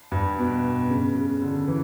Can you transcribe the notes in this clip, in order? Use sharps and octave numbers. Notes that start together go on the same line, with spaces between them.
G2
B2
C#3
C#3
D3
E3